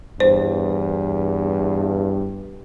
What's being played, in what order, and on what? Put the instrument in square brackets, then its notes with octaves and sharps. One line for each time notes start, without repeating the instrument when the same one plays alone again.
[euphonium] E2 [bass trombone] G2 [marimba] C5